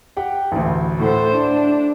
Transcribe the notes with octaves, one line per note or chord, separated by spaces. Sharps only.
G4 F#5 G5
A1 D2
A2 A4 C5 F#5
D4 E4